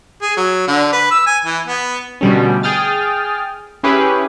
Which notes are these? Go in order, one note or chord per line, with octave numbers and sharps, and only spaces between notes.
G#4
F#3
D3
B4
E6
G#5
E3
B3
B2 D3 G3 A3 C#4
G#4 G5 D#6 F6 A6
C#4 E4 G4 G#4 B4